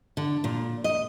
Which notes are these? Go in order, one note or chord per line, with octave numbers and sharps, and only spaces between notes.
D3
A#2
D#5